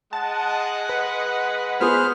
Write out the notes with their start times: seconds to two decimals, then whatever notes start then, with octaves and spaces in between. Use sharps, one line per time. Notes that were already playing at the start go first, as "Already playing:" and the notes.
0.13 G#3 D#5 F#5 A5
0.89 B4
1.80 B3 G#4 C5 F6